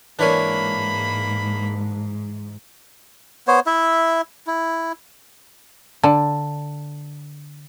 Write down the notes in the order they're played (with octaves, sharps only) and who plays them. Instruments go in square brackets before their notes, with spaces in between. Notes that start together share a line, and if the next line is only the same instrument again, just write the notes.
[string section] G#2 [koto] E3 C#5 G#5 [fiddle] A#3 B5 [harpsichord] D4 A#4
[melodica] B3 C5 C#5
E4 E5
E4
[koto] D3 [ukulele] A5